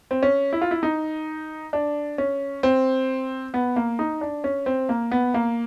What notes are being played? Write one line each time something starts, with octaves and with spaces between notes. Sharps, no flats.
C4
C#4
E4
F4
E4
D#4
D4
C#4
C4
B3
A#3
D#4
D4
C#4
C4
A#3
B3
A#3